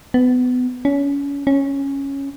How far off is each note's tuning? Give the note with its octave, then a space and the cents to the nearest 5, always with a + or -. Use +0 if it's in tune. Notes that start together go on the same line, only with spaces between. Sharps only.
B3 +25
C#4 +30
C#4 -5